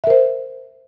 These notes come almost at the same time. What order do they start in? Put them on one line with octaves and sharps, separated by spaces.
E5 A#4 C5